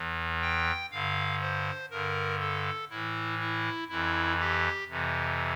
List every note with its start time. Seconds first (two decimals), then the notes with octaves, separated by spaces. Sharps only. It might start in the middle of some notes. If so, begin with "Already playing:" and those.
Already playing: E2 E3
0.41 G5
0.91 G2 D3 F5
1.41 C5
1.91 G2 D3 A#4
2.40 A4
2.90 A2 E3 E4
3.40 E4
3.89 F2 E3 E4
4.39 G4
4.88 F2 C3 E3